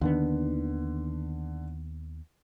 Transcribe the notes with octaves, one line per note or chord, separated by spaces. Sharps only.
D#2 D3 D#3 B3